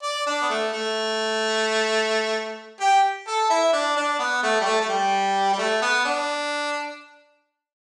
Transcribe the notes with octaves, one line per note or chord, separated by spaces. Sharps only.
D5
D4
B3
A3
A3
G4
A4
E4
D4
D4
B3
A3
G3
A3
A3
G3
G3
A3
B3
D4